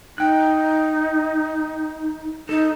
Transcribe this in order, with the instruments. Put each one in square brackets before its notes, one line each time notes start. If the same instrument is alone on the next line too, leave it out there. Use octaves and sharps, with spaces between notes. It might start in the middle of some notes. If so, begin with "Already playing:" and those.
[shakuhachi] D#4 [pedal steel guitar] G5 F#6
[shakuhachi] D#4 [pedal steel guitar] A4